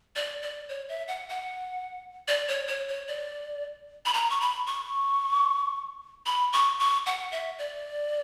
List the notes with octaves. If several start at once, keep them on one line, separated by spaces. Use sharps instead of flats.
D5
D5
C#5
E5
F#5
F#5
D5
C#5
C#5
C#5
D5
B5
A#5
C#6
B5
C#6
B5
C#6
C#6
F#5
E5
D5